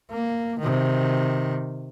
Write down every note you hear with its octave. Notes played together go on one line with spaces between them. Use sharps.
A#3
C3 D#3